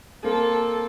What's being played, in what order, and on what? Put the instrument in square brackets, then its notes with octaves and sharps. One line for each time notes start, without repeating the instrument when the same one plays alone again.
[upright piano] A#3 C4 [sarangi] A4